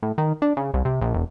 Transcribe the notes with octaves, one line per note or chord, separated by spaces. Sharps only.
A2
D#3
D4
C#3
C2
C3
A#1
E1